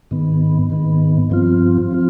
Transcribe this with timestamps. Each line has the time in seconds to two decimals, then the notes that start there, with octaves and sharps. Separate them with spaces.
0.11 G#2 D#3 B3
0.70 G#2 D#3 B3
1.30 G2 F3 C4 F4
1.91 F3 C4 F4